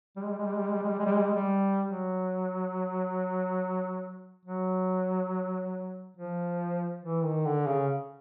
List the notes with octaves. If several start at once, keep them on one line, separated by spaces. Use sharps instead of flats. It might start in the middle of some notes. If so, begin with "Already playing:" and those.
G3
G#3
G3
G#3
G3
G#3
G3
G#3
G3
G#3
G3
G#3
G3
G#3
G3
G#3
G3
F#3
F#3
F3
E3
D#3
D3
C#3